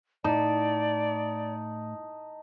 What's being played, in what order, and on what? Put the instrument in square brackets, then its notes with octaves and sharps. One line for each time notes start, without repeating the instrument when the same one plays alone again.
[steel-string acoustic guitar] A2 [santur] D#4 [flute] D5 [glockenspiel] A5